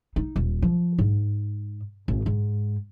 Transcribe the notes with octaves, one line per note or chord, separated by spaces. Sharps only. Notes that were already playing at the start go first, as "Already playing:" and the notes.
D#4
D#1
F3
G#2
G#1
G#2